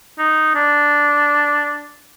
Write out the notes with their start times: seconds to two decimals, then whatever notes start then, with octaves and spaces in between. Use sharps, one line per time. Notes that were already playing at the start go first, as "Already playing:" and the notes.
0.19 D#4
0.55 D4